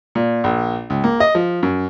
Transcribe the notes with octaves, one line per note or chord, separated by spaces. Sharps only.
A#2
A#1
C#2
A#3
D#5
F3
F#2